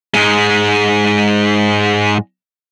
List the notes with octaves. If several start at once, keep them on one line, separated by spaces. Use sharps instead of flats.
G#2 G#3